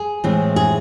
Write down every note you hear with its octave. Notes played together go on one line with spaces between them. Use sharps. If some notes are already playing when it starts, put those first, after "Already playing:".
Already playing: G#4
A2 E3 G#3 C4
G#4